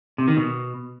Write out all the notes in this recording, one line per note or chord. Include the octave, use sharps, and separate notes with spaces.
C3
D#3
B2